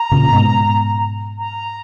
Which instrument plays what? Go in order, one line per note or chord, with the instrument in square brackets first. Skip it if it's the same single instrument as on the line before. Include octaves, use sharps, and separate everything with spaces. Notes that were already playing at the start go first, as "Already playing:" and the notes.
Already playing: [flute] A#5
[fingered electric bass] A#2 C#3
G#2 B2
[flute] A#5